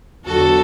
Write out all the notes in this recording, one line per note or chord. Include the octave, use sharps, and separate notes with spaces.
E2 D3 F#3 F#4 A4